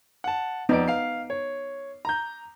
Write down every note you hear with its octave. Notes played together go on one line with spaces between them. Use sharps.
F#5 A5
F2 B3 D#4 D5 D7
F5 C7
C#5
A#5 G6